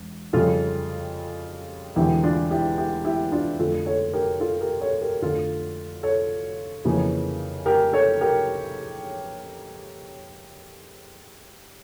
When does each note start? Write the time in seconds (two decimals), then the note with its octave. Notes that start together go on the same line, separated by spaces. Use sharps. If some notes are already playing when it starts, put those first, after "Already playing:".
Already playing: E1
0.33 F2 C#3 G3 F4 A4
1.96 E1 E2 D3 E4 G4
2.23 D4 F4
2.51 E4 G4
2.77 E4 G4
3.05 E4 G4
3.32 D4 F4
3.59 F2 D3 F3 A3 F4 A4
3.86 A4 C#5
4.13 G4 A#4
4.40 F4 A4
4.61 G4 A#4
4.81 A4 C#5
5.01 G4 A#4
5.22 F2 D3 F3 A3 F4 A4
6.03 A4 C#5
6.85 F2 C#3 E3 A#3
7.66 G4 A#4
7.93 A4 C#5
8.21 G4 A#4